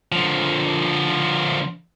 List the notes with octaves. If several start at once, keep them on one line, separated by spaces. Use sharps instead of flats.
D3 F3